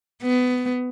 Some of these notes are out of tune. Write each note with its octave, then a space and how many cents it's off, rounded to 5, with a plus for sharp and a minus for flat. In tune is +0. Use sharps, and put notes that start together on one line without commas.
B3 +20